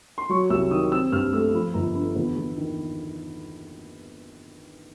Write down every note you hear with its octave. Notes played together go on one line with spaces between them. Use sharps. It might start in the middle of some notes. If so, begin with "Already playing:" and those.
C6
F#3 C#6
C2 E6
D#3 D#6
C4 E6
G2 F6
A3 E6
F3 B5
G1 A#5
D3 B5
E2
E2
D#3